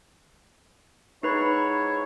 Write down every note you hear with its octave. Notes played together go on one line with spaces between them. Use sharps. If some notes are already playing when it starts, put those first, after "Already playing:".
G#2 D#4 E4 B4 C#5 B5